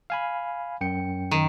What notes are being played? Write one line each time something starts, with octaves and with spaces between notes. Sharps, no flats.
F5 G#5 B5
F#2 G5 C#7
D#3